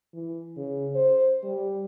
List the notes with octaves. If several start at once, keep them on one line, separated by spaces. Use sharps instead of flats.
E3
C#3
C5
G3